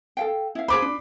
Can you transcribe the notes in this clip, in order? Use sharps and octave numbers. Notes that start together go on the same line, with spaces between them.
A4 F5 G5
E4 F5
G#4 C5 B5 D6
D4